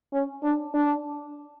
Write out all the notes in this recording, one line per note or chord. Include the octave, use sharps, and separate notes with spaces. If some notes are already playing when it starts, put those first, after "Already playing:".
C#4
D4
D4